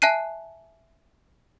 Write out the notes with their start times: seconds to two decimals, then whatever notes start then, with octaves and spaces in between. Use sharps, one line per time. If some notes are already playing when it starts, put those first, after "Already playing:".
0.02 E5 G#5 A5 F#6 C7 D#7